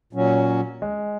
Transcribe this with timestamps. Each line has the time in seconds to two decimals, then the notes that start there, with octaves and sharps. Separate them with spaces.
0.13 A#2 F#3 C#4
0.82 G#3